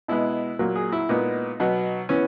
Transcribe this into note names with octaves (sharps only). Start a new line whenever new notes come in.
B2 G#3 B3 E4
A#2 F#3 A#3
G#4
E4
A#2 G#3 B3 D#4
B2 F#3 B3
E3 B3 C#4